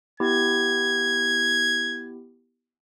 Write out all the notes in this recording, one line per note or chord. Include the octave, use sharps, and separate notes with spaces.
B3 E4 G4 G#6